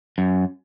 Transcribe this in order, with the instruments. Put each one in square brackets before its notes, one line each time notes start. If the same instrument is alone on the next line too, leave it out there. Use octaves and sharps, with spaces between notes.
[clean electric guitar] F#2